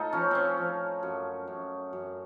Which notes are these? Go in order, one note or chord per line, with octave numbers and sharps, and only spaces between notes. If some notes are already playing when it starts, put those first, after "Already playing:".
Already playing: A2 D#4 F4 A4
F3 C#4
C4 C#4
F3
F#2
F#2
F#2